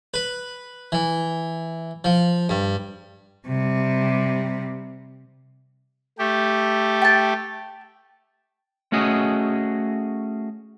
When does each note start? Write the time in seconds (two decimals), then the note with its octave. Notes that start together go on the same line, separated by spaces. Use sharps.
0.14 B4
0.92 E3
2.04 F3
2.49 G2
3.48 C3 G3
6.18 A3 G4
7.02 G5 A5
8.92 A3 C#4 F#4 G#4 D#5